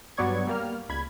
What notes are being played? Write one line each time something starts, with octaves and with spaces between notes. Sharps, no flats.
G2 F#3 B3 D5 C#6 G#6
G3 A#3 F6
C#2 B5 G#6